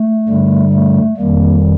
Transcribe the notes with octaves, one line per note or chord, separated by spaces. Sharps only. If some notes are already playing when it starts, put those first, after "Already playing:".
Already playing: A3
G2 D3 G3
A3
F2 D#3 G3 A#3